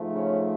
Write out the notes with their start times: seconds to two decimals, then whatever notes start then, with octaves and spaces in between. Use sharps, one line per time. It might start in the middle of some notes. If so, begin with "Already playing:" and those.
Already playing: G#2 F3 A3
0.11 C#3 C#4